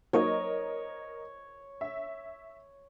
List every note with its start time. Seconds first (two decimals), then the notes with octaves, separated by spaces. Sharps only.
0.13 F#3 A#3 D#4 A#4 C#5 D#5
1.81 E5